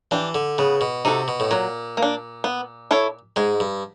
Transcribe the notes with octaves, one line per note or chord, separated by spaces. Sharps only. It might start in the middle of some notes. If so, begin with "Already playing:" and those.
E3 D4 G4
D3
C#3 B3
B2
C3 D#4 F#4 A4
B2
A2
A#2 F#3
A#3
D4
B3
E4 A4 C#5
G#2 G#3
G2